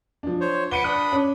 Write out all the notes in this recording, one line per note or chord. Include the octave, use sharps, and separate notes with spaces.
F3 D4
C5 C#5
B4 F#5 D6 C#7 D#7 G7
D4 B5 D#6 F#6
C#4